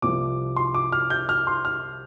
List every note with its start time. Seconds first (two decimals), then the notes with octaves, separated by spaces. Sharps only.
0.02 C2 C3 F3 D6
0.56 C6
0.74 D6
0.92 F6
1.10 G6
1.29 F6
1.47 C6
1.65 F6